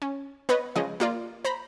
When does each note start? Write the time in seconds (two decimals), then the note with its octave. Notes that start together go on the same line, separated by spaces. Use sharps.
0.02 C#4
0.49 B3 B4 C#5 D#5
0.76 C#3 F3 G#3 D#5
1.00 A#3 F4 D5
1.45 C5 A#5 B5